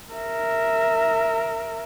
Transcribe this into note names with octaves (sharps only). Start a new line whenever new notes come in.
A#4 E5